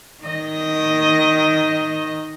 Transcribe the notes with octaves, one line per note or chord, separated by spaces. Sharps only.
D#3 D#5